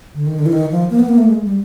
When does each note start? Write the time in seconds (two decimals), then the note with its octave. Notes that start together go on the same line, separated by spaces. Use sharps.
0.15 D3
0.26 D#3
0.39 D3
0.46 E3
0.53 D#3
0.71 F3
0.90 A#3
0.99 B3
1.09 A#3
1.18 A3
1.27 G#3
1.46 G3